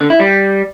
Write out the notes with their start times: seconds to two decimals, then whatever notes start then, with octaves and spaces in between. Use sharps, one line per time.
0.01 D3
0.10 E4
0.20 G3